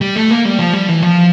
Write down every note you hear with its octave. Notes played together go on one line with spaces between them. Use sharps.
G3
A3
A#3
G3
F3
G3
E3
F3